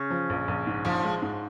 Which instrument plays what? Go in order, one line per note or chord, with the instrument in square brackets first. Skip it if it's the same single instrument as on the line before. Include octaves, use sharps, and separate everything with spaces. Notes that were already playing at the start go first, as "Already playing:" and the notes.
Already playing: [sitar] C#3
[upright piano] F3
A#1
A#1
G#2
[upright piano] A#1 [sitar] F3
[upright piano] G#3
G#2